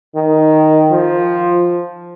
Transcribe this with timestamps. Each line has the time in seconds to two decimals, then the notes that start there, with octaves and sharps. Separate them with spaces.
0.15 D#3
0.90 F3